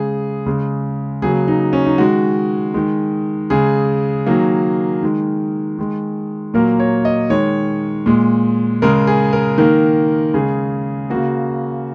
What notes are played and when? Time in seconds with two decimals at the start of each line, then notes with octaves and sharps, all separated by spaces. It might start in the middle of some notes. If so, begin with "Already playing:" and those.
Already playing: C#3 G#3 G#4
0.46 C#3 G#3
1.22 C#3 F#3 A#3 G#4
1.48 D#4
1.73 C#4
1.86 D#4
1.98 D#3 G#3 F#4
2.74 D#3 G#3
3.50 C#3 G#3 G#4
4.26 D#3 F#3 A#3
5.03 D#3 G#3
5.78 D#3 G#3
6.54 A#2 F#3 A#3 A#4
6.80 C#5
7.05 D#5
7.30 D#3 G#3 C#5
8.06 A#2 G#3
8.82 C#3 G#3 A#4
9.07 G#4
9.33 A#4
9.58 D#3 A#3 A#4
10.34 C#3 G#3 G#4
11.10 C#3 A#3 F#4